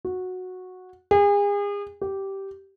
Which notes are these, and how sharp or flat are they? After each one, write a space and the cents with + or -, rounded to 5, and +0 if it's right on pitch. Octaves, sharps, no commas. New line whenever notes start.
F#4 -10
G#4 -40
G4 -10